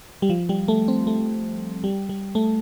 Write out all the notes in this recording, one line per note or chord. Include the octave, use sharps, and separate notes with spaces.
G3
F3
G3
A3
C4
A3
G3
G3
A3